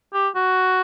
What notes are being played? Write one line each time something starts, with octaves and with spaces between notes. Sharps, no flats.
G4
F#4